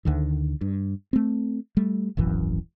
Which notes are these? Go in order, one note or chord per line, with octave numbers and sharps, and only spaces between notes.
D2 D3 D#3
G2
A3 C4
G3 A3
D#1 G#1 F#2 E3